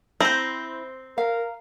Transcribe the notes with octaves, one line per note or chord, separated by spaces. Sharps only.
C4 E4 C5 A#5
A#4 F5